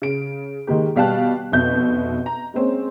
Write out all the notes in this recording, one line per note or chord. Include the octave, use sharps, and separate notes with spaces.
C#3 D7
D#3 G#3 A#3 G4
B2 G3 F5 G5 A5 F#6
F1 B2 E5 G6
A#5
G#3 A#3 C4 C#4